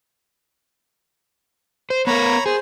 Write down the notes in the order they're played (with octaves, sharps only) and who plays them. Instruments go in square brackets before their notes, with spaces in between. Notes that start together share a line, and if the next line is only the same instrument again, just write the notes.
[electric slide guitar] C5
[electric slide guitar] B3 A#4 [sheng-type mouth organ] C#5 A#5 B5
[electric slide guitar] G#4 [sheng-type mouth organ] C5